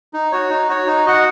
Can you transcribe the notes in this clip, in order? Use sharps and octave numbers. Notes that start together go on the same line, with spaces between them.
D#4
F#4 C#5
D#4
F#4 C#5
D#4
F#4 D#5 F#5